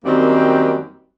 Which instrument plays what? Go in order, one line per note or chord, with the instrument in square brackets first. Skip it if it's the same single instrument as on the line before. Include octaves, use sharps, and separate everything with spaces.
[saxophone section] F#2 D#3 G3 A#3 C4